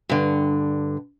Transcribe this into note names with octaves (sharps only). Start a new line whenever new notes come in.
G2 D3